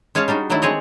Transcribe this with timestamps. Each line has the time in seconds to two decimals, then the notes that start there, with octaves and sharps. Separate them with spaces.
0.15 G#3 C#4 C#5 F5 A5
0.28 G3 D4 D#4 F#4
0.50 D#3 F#3 A3 D4 E4
0.62 G#3 C4 G#4 C#5 D#5